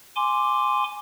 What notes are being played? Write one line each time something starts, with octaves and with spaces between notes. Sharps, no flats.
G#5 C6 D6